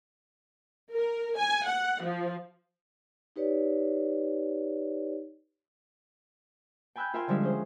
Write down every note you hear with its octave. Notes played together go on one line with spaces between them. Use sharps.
A#4
G#5
F#5
F3
D#4 G4 B4 C#5 D5
G5 G#5 B5 E6 F#6 G6
F4 A#4 E5 G5 G#5 C6
D3 F3 G3 G#3 E5
C#4 G#4 C5